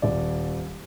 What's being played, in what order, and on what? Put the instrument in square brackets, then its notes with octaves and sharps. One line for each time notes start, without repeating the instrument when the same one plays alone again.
[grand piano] D#1 D5